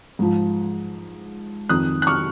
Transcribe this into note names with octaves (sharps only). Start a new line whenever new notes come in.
G#2 F3
F2 D#3 D#6 F#6
F#6
C#6 F6